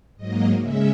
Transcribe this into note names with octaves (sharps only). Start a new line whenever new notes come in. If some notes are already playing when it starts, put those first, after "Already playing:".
G#2 F#3 A#3 D#5
C#3 G#3 C#4 E5